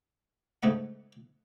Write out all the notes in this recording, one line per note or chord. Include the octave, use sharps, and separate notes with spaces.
G#2 C#3 A3 D#5 F#5